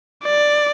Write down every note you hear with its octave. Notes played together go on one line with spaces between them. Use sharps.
D5